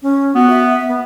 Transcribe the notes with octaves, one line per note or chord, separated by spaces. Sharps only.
C#4
B3 F#4
E5
B3